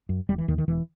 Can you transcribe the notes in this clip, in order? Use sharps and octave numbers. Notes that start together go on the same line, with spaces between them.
F#2
E1 G3
E3
D#2 D#3
D#3
E1 E3